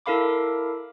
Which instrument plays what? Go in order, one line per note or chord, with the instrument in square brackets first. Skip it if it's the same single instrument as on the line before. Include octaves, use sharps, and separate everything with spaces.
[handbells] E4 A4 A#4 F5 B5 D6